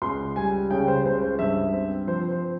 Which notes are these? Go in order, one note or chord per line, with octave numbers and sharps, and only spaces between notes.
C#2 C6
G3 G#5
C#3 G5
C5
C#2 C5
C5
G2 E5
C4
F3 C5
C5